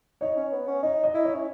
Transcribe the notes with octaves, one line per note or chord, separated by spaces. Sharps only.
D#4 C#5
C#4
B3
C#4
D#4 D#5
D#5
E4
C#5
C#4